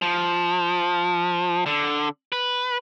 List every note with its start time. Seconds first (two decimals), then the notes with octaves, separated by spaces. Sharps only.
0.02 F3
1.66 D3
2.32 B4